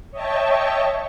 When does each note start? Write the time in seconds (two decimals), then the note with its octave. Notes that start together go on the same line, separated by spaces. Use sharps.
0.11 C#5 D#5 E5 G5 A5 C#6